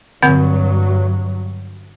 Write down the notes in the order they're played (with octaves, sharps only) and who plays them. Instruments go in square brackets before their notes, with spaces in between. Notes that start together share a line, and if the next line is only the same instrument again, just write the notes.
[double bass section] G2 F#3 [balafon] D3 C4 F#5